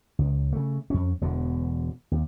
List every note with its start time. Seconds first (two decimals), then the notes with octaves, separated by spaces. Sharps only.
0.19 C#2
0.53 C#3 A3
0.90 F2 C#4
1.21 E1 E2 B2 D3
2.12 D#2